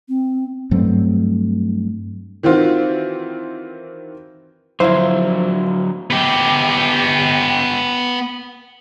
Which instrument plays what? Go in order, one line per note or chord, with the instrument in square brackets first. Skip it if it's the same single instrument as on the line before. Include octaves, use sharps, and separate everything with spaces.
[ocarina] C4
[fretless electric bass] G2 F#3 A3 C4
[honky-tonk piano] D#3 E3 C4 F4 F#4
[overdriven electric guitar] D3 F#3 [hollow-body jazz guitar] F3 C5 [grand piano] E4 F4
[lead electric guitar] B3 G4